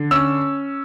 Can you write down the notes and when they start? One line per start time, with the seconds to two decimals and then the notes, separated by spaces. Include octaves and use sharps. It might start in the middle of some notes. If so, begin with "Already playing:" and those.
Already playing: D3
0.11 C#4 E6